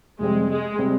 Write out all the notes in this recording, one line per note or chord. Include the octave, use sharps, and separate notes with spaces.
F2 C3 G3 G#3 C4
G#3
C3 G3 C4